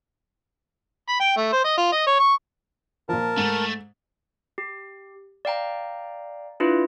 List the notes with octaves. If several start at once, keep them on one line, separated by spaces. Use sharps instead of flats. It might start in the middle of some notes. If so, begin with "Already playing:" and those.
B5
G5
A3
C5
D#5
F4
D#5
C#5
C#6
A#2 F3 A#4 A5
G#2 A3
G4
D5 F5 G5 A#5
D4 E4 F4 B4